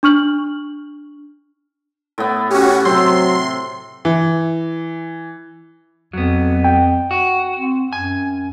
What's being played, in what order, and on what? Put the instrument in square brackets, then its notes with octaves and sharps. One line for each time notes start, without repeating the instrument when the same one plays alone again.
[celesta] D4 C#6 F6 F#7
[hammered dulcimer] A2 B3
[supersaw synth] C#4 F#4 [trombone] G4
[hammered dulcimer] C3 C4 [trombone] F#3 [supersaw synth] C6
[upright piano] E3
[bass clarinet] F2 [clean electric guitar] F#3 B3
[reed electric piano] G5
[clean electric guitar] F#4
[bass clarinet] C4
[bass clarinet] F#2 [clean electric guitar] G#5